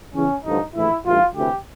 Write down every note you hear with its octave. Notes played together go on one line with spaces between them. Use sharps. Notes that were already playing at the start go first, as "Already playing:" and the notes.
E2 C#3 E3 C#4
A1 G2 D3 F3 D#4
A#1 A2 E3 E4
A1 G2 E3 F4
D2 C3 E3 G4